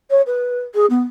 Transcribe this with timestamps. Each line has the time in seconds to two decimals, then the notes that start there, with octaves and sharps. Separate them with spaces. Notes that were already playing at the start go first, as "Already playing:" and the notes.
0.10 C#5
0.26 B4
0.74 G#4
0.90 B3